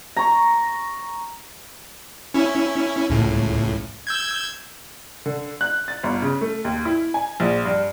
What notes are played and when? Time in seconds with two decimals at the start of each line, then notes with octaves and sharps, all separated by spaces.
0.16 A#5 C#6
2.34 C#4 E4
3.10 C#2 A2
4.07 E6 G6 G#6
5.26 D3
5.61 F#6
5.88 A6
6.03 G1
6.22 C#3
6.41 A3
6.64 D#2
6.85 E4
7.14 G#5
7.40 A#1
7.65 G2